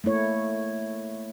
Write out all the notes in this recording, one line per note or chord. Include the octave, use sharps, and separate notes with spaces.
A3 A#3 E4 C#5